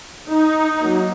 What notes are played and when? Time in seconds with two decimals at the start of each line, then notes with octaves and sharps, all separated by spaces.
0.31 D#4
0.81 F#3 A#3